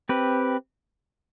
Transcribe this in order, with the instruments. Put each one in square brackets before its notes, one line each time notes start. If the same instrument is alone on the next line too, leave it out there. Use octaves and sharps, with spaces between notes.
[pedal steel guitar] C4 G4 B4